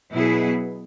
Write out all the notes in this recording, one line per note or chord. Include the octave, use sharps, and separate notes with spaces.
B2 F#3 B3 E4 G#4